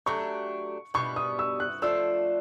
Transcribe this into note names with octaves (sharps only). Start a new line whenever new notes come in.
F#3 A3 D4 G4 C#6
B2 G3 B3 C#6
D#6
E6
F#6
F3 A3 D4 F4 E6